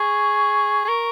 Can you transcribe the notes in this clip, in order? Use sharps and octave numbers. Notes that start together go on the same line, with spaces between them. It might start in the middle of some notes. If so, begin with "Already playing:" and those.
Already playing: G#4 C#6
G#4
A#4